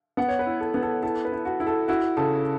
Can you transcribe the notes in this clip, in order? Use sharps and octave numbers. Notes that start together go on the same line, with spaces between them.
B3 F#5
C#5
B4
E4
A4
B3
A4
E4 A4
B4
E4
F#4
E4
A4
E4 F#4
C#3 A4